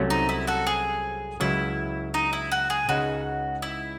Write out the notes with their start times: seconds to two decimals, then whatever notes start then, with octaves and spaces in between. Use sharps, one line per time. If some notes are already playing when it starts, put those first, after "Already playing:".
Already playing: C2 C3 F#3 A3 C#4
0.10 D#4
0.29 E4
0.47 F#4 A4
0.67 G#4
1.40 C#2 C#3 F#3 E4
2.14 D#4
2.33 E4
2.52 F#4
2.70 G#4
2.89 C#2 C#3 G#3 D#4 F#4
3.62 E4